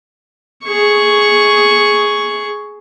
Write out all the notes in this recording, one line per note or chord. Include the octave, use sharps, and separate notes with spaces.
G#4 C#6